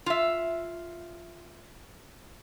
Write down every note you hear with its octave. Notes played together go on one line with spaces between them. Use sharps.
F4 E5